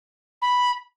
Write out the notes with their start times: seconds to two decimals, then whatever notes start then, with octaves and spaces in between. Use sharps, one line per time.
0.42 B5